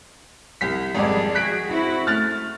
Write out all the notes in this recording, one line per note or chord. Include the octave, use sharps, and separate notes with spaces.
C2 B6
G#1 F2 G3 G#3 G#4 D5
F#4 G#4 F#6 B6 D7
C4 E4 F#4
A3 F6 F#6 A6